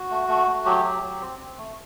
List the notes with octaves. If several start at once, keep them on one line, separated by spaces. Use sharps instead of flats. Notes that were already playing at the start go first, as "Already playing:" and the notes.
Already playing: F#4
A3
A3
A3
F#3 G4
F#3
F#3
C4
C4
A3